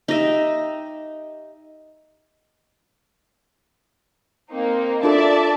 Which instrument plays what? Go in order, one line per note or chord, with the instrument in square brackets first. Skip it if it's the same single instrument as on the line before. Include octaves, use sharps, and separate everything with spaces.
[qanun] D#4 G4 D#5 E5
[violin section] A#3 C4 D#4
[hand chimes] D4 F4 A4 [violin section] D5 E5 A5